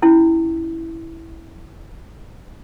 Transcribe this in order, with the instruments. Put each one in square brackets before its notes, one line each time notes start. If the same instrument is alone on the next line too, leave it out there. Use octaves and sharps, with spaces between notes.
[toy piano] C#4 E4